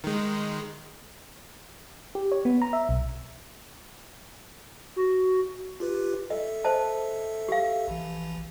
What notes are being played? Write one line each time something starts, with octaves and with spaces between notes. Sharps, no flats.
D#3 G#3
G4
C#5
B3
A#5
E5
B1
F#4
F4 G4 B4
A4 D#5 E5
C5 D#5 A5
G4 F5
A#1 E3